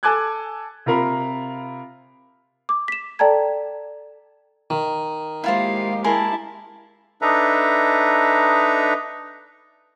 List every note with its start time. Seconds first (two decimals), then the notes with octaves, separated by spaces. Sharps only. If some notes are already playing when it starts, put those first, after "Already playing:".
0.03 A4 G#5 A5 D6 F#6 G#6
0.86 C3 F4 A#4 F5 B5
2.69 D6
2.88 B6 E7
3.19 A4 D5 G5 A5 A#5 G#6
4.70 D#3
5.44 G#3 A#3 E4 F4 G4 C5 F5
6.04 E4 G#4 A#4 A5 C6
7.22 D4 D#4 A4 B4 E5 A#5